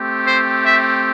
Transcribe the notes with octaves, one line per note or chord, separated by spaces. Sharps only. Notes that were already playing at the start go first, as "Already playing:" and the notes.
Already playing: A3 C4 G4
C5
E5